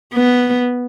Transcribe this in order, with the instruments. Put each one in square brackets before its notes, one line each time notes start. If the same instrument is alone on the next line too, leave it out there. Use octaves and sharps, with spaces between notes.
[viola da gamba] B3